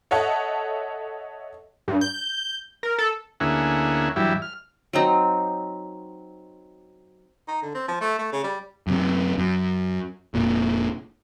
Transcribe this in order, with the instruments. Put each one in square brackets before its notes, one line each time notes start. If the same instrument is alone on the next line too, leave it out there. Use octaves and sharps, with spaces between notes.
[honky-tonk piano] A4 C#5 D#5 E5 F#5 A5
[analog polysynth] G2
G6
A#4
A4
[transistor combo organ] D2 A#3 C#4 E4 G#4 F#5
G2 E3 F#3 G3 E4
F6
[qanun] F#3 C4 D#4
[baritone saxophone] D#4
D3
C4
F3
A3
A3
C#3
G3
[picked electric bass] F#2 C3
F#2
F1 A#2